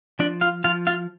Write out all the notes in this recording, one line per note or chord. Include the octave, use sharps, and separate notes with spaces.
F3 D4 D5
F4 F5
F3 F4 F5
F4 F5